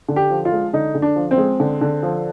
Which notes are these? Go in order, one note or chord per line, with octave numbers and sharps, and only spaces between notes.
D3
G4
F3
F4
G#3
D3 D#4
D3
D4
F3
C4
G#3
D3
D3
F3